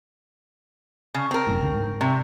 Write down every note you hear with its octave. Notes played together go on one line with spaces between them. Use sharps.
C#3
C4 A#4
F1 F#2 A2
C#2 D3
G#2
C3